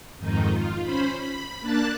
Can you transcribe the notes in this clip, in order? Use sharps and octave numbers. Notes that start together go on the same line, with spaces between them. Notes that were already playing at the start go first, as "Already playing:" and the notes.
F2 G#2 D#3 D#4
F4
C#4 C5 B5
B5
A#3 D4 A5 F#6 A6